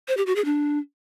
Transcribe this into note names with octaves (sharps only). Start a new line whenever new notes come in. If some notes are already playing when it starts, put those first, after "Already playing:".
C5
G4
F#4
G#4
D4